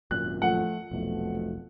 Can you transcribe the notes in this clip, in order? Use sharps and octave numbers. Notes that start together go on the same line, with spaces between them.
G#1 F#2 A#2 F#6
F3 A3 F#5
F1 B1 B2 F3 A3